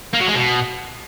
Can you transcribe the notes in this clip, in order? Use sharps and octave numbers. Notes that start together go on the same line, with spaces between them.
A#3
F#3
G#3
B2